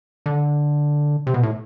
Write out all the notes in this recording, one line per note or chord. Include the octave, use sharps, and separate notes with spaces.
D3
C3
B2
A2